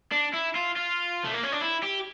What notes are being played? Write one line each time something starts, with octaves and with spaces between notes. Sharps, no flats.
D4
E4
F4
F4
A3
A#3
C#4
D4
E4
G4